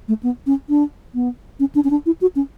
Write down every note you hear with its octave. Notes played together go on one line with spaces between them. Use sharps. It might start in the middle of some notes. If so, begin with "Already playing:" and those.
A3
B3
C#4
D4
B3
C#4
D4
C#4
D4
E4
F#4
C#4